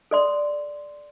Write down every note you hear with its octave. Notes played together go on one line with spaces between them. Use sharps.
A4 D5 C6